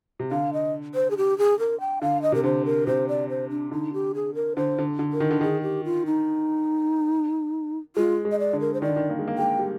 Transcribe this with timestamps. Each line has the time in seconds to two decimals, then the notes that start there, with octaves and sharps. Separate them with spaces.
0.19 C3
0.31 D3 F5
0.53 D#5
0.95 C5
1.11 G#4
1.17 G4
1.38 G#4
1.59 A#4
1.80 G5
2.02 D3 F5
2.22 D#5
2.32 C3 A#4
2.44 D3 C5
2.65 A#4
2.87 C3 C5
3.08 D5
3.29 C5
3.50 D4
3.71 D3 D#4
3.93 G4
4.15 G#4
4.35 A#4
4.56 D3 C5
4.78 D3
4.99 D3
5.13 A#4
5.20 D#3
5.31 D3
5.41 D#3 G#4
5.62 G4
5.85 F4
6.06 D#4
7.96 G#3 F4
8.25 G#3
8.32 D#5
8.39 D5
8.53 D3
8.60 A#4
8.74 C5
8.82 D#3 D5
8.89 D3
8.96 D#3
9.10 A#3
9.19 G#3
9.28 A#3
9.38 G#3 G5
9.59 G3